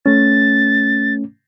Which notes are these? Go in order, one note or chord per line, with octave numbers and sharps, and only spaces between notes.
A3 C#4 A6